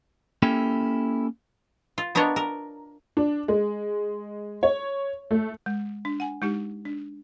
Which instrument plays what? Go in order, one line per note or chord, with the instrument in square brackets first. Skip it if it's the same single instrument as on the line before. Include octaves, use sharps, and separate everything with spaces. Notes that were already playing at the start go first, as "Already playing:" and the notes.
[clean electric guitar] A#3 C#4 E4 G4 A4 G5
[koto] F4
B3 D4 A#4 C#5 D#5
A#4
[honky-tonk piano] D4
G#3
C#5
A3
[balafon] G#3
D4
F#5 G#5
G#3 D#4 G4
D4